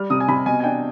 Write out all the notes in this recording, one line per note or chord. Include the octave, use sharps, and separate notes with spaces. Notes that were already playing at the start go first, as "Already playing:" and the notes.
Already playing: G3 F6
C3 D#6
G#5
C3 B5
B2 G#5
G#5
D4 G5